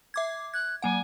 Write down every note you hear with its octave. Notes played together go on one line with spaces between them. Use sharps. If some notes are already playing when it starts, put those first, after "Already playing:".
E5 D6 G#6
F#6 G#6
F#3 A#3 F#5 G#5